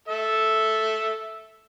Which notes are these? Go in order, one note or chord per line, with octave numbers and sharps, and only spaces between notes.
A4 E5